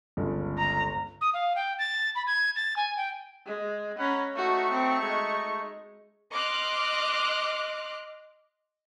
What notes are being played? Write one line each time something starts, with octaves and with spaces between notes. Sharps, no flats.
G1 C#2
A#5
D#6
F5
G5
A6
B5
G#6
A6
G#5
G5
G#3
C#4 F#5 A#5 B5
A3 D#4 F#4 C#6
C4
G#3
D#5 C6 D6 F6 F#6